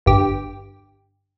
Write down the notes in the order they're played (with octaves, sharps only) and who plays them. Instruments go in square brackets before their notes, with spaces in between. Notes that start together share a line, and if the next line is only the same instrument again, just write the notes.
[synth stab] G1 G4